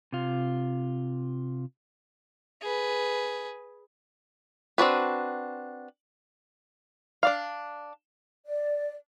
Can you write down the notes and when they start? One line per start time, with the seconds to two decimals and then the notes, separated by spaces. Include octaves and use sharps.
0.12 C3 F4
2.62 G#4 B4
4.78 C4 D4 F#4 B4
7.23 D4 D5 F5
8.46 D5